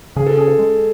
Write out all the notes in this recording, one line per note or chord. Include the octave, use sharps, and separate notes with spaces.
C#3 G#4
A4
C#4 G#4
A4
G#3